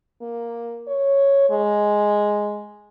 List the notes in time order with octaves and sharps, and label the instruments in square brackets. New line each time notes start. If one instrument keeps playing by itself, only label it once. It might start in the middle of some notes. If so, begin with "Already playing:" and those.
[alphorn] A#3
C#5
G#3